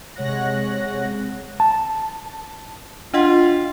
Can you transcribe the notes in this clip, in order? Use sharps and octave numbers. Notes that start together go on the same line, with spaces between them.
C3 G#3 C#5 F#5 F#6 A#6
A5
D4 F4 D#5 F#5